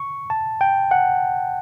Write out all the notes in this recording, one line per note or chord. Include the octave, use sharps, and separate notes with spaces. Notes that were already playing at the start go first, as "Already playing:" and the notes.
Already playing: C#6
A5
G5
F#5